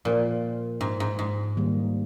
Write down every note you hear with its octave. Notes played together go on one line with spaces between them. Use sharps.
A#2 F3 A#3 F4 C5 F5
G#2
G#2
G#2
D#3 G3 A#3